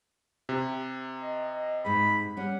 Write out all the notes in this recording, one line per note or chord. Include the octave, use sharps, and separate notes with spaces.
C3
D#5
D#5
G#2 G#4 B5
G3 C#4 F#5